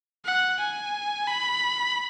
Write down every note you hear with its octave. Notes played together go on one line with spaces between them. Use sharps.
F#5
G#5
B5